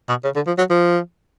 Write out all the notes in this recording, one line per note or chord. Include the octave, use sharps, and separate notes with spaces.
B2
C#3
D3
F3
F#3
F3